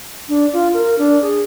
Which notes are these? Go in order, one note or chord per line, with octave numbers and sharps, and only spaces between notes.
D4
F4
A#4
D4
G#4